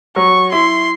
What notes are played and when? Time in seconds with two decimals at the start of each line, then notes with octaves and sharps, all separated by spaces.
0.16 F#3 C#6
0.52 E4 C6